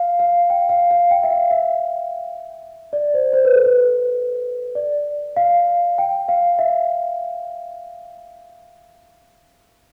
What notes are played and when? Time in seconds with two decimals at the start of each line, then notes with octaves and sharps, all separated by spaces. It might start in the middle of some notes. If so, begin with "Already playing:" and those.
Already playing: F5
0.19 F5
0.50 G5
0.69 F5
0.91 F5
1.11 G5
1.23 E5
1.31 F5
1.51 E5
2.93 D5
3.14 C5
3.33 C5
3.45 B4
3.55 A4
3.66 B4
4.75 D5
5.36 F5
5.98 G5
6.28 F5
6.59 E5